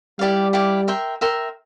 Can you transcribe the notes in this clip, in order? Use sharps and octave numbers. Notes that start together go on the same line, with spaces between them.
G3 E4 G4 D5 F5
E4 G4 D5 F5
A#4 E5 G5 C6
A#4 E5 G5 C6